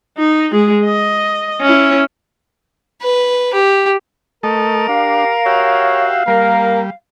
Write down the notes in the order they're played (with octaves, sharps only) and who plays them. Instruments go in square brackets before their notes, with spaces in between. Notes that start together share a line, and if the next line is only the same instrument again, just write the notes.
[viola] D#4
G#3 G#4
D#5
C#4 E4
[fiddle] B4
G4
[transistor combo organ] A3 A4 D#5 [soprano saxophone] A#4
[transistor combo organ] D4 [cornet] G4 [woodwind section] F5
[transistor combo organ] F#4 G4 E5 [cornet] C#5
[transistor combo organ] G3 [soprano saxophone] A#3 [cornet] A#4